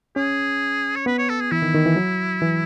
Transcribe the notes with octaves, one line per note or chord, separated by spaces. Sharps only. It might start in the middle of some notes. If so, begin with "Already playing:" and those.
C#4 G#4
C#5
B3 B4
C#5
A4
G#4
E3 E4
D#3
D#3
E3
F#3
E3